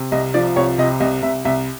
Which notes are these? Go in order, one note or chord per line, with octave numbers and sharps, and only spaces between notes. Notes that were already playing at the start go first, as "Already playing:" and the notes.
Already playing: C3
C2 D#5
F3 D5
C2 C#5
C3 D#5
C2 D#5
C2 E5
C2 E5